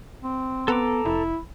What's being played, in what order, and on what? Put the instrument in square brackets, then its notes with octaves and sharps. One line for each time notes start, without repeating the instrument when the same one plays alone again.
[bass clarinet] C4
[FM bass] B3 [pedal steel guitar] A4 A#5 D6
[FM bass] F1 [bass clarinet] E4